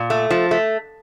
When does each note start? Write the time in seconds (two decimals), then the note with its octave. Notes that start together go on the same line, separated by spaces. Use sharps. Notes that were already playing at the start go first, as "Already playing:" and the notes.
Already playing: A#2
0.10 A3
0.30 F3
0.51 A3